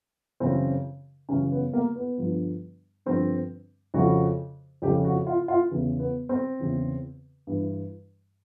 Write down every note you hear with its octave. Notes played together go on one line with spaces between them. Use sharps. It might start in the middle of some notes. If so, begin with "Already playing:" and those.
F#2 C#3 E3 C4
F#2 C#3 E3 C#4
B3
A#3
B3
G2 D3 F3
G2 D3 F3 C4
F2 C#3 F3 F#4
F2 C#3 F3 G4
F#4
F4
F4
E2 C#3 E3
B3
C4
E2 C#3 E3
G2 E3